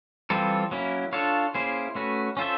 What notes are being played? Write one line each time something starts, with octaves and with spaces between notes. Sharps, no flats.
E3 G3 C4 F4 A4
F#3 A#3 C#4 E4
D4 F4 A4 C#5 F5
A#3 C#4 E4 G#4 C5
A3 C#4 F#4 B4
C#4 F4 A4 C5 E5